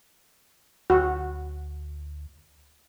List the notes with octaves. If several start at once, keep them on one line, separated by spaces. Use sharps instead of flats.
D2 F#4